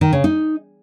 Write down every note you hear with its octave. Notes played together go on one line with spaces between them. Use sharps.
D#3
C#3
D#4